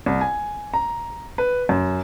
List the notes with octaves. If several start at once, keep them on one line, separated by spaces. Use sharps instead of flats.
C2
G#5
A#5
B4
F#2